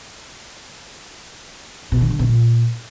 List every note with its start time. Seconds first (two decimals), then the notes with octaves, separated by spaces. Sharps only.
1.92 B2
2.01 D#3
2.10 D3
2.19 B2
2.28 A#2